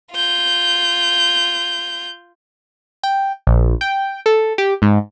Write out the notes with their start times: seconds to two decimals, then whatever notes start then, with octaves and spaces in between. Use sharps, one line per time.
0.13 F4 G6
3.04 G5
3.47 A#1
3.81 G5
4.26 A4
4.58 G4
4.82 G#2